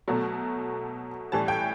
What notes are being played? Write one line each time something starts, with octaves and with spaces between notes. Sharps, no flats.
B2 F#3 A3
A2 E3 G3 A5
G5